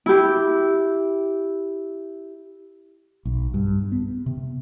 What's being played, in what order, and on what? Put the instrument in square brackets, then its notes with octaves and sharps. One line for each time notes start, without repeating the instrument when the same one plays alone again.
[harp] E4 G4
[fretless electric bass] B1
G2
B3
C3